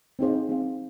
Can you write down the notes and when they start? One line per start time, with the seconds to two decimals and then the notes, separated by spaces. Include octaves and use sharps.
0.19 C4 D#4 G#4 C5 F5
0.49 C4 D#4 G#4 C5 F5